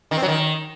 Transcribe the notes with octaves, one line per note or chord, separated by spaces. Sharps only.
D#3
C4
F#3
D#3